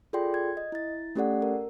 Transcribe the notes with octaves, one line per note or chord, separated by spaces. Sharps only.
F4 G#4 A4 D5 G5 C6
G#6
D#5
E4 A6
A3 C#4 G4 A4 D5 F#5
A#4